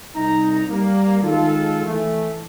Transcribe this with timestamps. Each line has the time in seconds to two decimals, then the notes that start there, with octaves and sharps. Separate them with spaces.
0.15 C2 D#4 A#5
0.69 G3 A#3
1.23 D#3 G#3 F4 A4
1.86 E3 A3